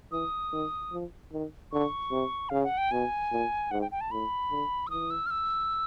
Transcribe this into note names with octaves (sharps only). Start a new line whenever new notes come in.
E3 D#6
D#3
F3
D#3
D3 C#6
C3
C#3 F5
F#5
G5
B2 G#5
A#2
G#2 F#5
G5
G5
A5
A2 B5
D3
E6
E3 D#6
E6
F6
E6